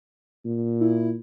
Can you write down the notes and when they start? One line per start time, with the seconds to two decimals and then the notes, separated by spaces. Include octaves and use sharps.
0.45 A#2
0.81 E4